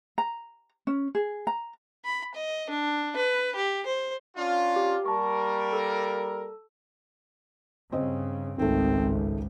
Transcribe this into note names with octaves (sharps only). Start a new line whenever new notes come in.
A#5
C#4
G#4
A#5
B5
D#5
D4
B4
G4
C5
C#4 D4 F4
G4
G3 A#3 A#4 A5 C#6
A4
G2 C#3 C4 D#5
G#1 C#2 D#3 A3 C4